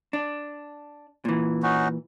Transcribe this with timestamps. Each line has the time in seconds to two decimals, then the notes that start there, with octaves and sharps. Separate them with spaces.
0.13 D4
1.25 A#2 E3
1.63 C#4 D#4 F#4